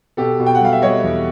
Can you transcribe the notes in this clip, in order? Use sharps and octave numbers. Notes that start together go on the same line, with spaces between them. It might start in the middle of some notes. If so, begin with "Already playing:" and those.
B2 G4 A4
B2
G5
F#5
G3 F5
E5
G3 C#5 D#5
E2